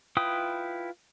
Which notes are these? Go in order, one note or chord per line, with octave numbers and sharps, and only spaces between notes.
E4 F4 B4 G5 D#6